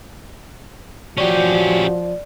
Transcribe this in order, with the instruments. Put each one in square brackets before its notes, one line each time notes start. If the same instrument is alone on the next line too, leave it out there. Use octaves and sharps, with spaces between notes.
[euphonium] F3 [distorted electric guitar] C#4 G4 [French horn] F#4 [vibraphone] D5